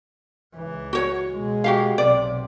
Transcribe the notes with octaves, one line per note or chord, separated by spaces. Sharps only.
C#2 E3
F#4 C#5
B2 G#3
F#4 G4 F5
B1 C3 D5